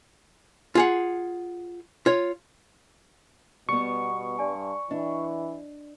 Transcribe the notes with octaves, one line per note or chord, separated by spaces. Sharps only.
F4 G#4 F#5
F4 C#5
B2 G3 B3 C#6
G2 D5 G#5
E3 D4 D#5